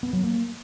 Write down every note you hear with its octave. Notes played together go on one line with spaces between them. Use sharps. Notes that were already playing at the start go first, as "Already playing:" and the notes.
B3
F#3
A#3